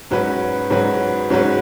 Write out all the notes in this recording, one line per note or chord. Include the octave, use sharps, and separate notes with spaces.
G#2 F#3 C#4 F#4 B4
G#2 F#3 C#4 F#4 B4
G#2 F#3 C#4 F#4 B4